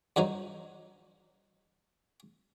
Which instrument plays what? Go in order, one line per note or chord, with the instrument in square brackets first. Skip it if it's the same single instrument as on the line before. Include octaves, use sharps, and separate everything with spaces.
[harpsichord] G2 F3 F#3 D#4